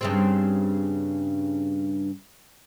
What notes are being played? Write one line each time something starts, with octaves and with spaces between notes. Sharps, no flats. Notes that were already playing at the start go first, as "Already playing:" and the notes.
G2 C#3 C4